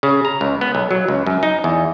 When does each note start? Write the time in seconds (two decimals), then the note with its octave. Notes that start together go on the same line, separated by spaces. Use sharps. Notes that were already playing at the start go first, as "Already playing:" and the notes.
0.03 C#3
0.25 A#5
0.41 C#2
0.61 B3
0.75 B1
0.91 F#3
1.08 C#2
1.26 F#2
1.43 D#4
1.64 E2